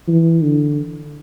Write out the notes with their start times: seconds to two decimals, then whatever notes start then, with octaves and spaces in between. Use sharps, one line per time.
0.08 E3
0.43 D3